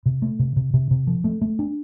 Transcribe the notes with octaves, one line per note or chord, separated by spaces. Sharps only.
C3
A3
C3
C3
C3
C3
F3
A3
A3
D4